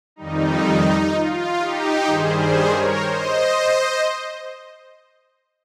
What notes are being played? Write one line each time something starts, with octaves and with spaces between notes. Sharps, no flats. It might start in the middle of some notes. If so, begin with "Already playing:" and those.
F2 D#3 G3 D#4
F4
D#4 G4
G2 D#3 G3 G#4 C5
G#4 C5
A#4 C#5
C5 D#5